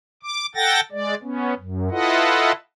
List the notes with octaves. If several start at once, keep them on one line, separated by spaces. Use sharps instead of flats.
D6
A4 F#5 G5 A6 A#6
G#3 D5
B3 C#4
F#2
E4 F4 A4 B4 D#5 F#5